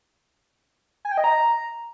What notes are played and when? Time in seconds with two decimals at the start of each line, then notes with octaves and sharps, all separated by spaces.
1.05 G#5
1.11 G5
1.18 D#5
1.24 A#5